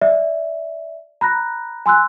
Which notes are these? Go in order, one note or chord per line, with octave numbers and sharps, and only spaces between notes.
D5 E5
A#5 B5 F#6 A#6
G#5 C6 E6 F#6